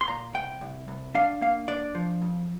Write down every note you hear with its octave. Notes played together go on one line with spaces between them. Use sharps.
C6
A#2 A#5
C2 G5
C2
C2
D4 F5
A#3 F5
D4 D5
F3
F2